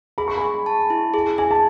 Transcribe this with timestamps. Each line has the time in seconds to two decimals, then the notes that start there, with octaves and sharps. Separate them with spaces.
0.18 G#4 B5
0.28 C#6
0.38 G#4 G#5 B5
0.66 A5
0.90 E4
1.14 G#4
1.38 G#4 G#5
1.51 A5